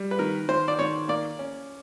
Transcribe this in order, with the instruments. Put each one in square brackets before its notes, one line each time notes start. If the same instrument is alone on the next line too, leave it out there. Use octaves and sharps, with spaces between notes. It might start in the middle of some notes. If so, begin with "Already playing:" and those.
Already playing: [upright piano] G3
[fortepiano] B4
[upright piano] D#3 [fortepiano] A#4
[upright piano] D#3 [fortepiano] C5
[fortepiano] D5
[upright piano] D#3 [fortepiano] C#5
[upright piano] A#3 [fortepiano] D5
[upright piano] C#4